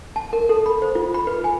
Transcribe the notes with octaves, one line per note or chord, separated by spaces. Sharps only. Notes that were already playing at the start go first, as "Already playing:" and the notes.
A5
A#4
A4
B5
C5
F4
B5
B4
G#5